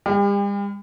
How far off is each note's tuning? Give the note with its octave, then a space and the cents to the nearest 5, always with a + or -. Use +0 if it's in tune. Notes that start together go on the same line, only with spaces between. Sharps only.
G3 +45 G4 +35